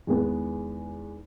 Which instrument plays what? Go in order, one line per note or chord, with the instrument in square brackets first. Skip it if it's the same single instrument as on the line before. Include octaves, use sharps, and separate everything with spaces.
[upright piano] E2 D#3 G#3 B3